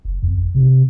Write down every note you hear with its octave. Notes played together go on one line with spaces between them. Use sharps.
F#1
F2
G1
C3